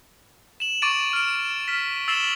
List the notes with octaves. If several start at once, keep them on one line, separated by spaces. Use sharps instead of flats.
E7 F#7
C#6 D6 A6 D7 D#7
F6 D7
F6 B6
E6 A6 C7 E7 F#7 G7